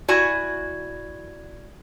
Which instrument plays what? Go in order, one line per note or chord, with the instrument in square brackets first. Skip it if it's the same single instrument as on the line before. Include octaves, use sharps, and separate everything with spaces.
[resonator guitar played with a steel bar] E4 F#4 G#5 [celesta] D5 G#6